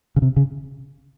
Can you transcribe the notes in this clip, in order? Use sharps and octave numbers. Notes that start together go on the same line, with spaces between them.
C#3
C3
C#3